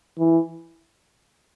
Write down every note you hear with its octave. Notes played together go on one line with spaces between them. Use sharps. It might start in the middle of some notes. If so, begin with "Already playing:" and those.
E3